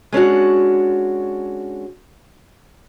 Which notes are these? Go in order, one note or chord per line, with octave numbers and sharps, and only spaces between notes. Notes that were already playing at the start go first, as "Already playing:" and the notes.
G#3 C#4 D4 F#4